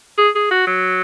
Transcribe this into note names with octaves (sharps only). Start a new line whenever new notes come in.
G#4
G#4
F#4
F#3